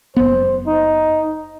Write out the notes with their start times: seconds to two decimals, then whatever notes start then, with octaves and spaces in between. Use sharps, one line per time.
0.16 F#1 B3 C5
0.67 D#4